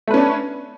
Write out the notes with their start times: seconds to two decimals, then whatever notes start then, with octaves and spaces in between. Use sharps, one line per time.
0.08 A3
0.11 B4
0.14 C#4
0.17 D4